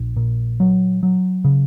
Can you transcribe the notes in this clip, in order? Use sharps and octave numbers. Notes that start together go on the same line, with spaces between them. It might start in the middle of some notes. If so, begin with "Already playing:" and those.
Already playing: A#1
A#2
F#3
F#3
C#3